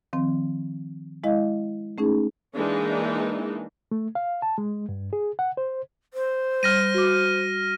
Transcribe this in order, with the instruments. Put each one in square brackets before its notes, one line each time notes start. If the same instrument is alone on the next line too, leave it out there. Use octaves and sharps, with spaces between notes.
[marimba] D#3 F3 C4
G#3 E4 D#5 F5
A3 C#4 D#4 G#4
[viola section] E3 G#3 A#3 D4 D#4
[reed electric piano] A3
F5
A5
G#3
G2
G#4
F#5
C5
[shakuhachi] C5
[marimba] G3 [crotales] F6 A#6 D#7
[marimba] F#4 D6